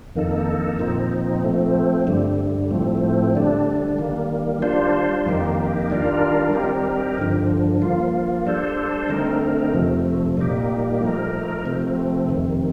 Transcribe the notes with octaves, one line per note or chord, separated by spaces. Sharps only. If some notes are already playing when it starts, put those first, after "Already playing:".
F2 D#3 A#3 D#4 A4
A#2 F3 C4 D#4
F3 A3 C4
G2 D3 G3
A2 F3 A3 C4
D3 G3 D4
D#3 G3 A#3
G3 D4 F4 C5
F2 D#3 A#3 D#4 G4
D#3 G3 D4 F4 A#4
G3 C4 D#4 G4 A#4
G2 D3 F3
F3 A#3 F4
G3 D4 A4 C5
D3 A3 C4 D#4 A#4
F2 C3 F3 A3
A#2 G3 A#3 D#4 G4
F3 A3 D#4 A#4
C3 F3 A3 C4
F2 C3 D#3